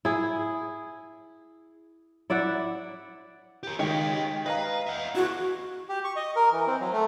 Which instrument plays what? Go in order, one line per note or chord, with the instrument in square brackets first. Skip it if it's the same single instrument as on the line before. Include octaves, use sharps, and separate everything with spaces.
[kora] E4 G#4
E4 D5 E5 F#5
[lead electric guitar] G4 A#4
[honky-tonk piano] D#3 G#3 G4 [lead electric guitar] C#5 D#5
[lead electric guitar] B4 [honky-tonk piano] D#5 F5 A#5
[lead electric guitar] E5 F#5
[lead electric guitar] E4 G#4 [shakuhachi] F#4
[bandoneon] G4
C#6
D#5
A#4
E3
C4
F#3
A3